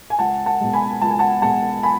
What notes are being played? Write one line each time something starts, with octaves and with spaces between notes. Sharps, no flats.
G#5
C#2 F#5 A5
F#5 A5
B2 G#3
G#5 B5
C#2 A5
G#5
F#5 A5
B2 G#3 F#5 A5
G#5 B5